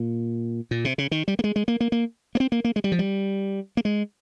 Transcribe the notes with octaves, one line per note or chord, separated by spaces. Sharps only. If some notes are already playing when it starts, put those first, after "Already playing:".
Already playing: A#2
A#2
C3
C#3
D#3
G3
A#3
G#3
G#3
A#3
A#3
A#3
A#3
C4
A#3
A#3
G#3
G3
F3
G3
A#3
G#3